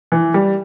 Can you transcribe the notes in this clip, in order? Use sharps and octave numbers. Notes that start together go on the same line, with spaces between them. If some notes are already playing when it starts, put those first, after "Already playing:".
E3
G3